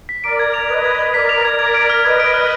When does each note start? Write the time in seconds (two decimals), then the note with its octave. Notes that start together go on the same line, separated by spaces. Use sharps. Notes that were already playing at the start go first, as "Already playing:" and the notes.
0.09 B6
0.24 A#4 D5 D7
0.39 G#6
0.54 F7
0.69 B4 D#5 G#6
0.84 G#6
0.99 G#6
1.14 A#4 D5 B6
1.29 F7
1.45 G#6
1.59 A#4 D5 G#6
1.74 D7
1.90 F6
2.05 B4 D#5 G#6
2.20 D7
2.34 F6